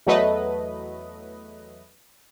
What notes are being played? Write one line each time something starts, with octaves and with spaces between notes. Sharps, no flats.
E2 F#3 A3 B4 D#5